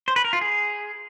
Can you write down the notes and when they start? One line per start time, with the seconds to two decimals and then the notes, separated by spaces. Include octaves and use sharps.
0.08 C5
0.16 B4
0.25 A#4
0.33 F4
0.41 G#4